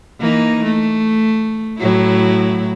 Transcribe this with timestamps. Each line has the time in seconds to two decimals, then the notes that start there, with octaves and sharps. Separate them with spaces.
0.20 E3 A#3 D#4
0.64 A3
1.78 A2 F#3 E4